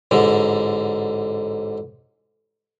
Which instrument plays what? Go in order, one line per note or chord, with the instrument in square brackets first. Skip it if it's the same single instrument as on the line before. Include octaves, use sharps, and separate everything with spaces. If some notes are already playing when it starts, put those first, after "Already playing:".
[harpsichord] A1 G#2 D3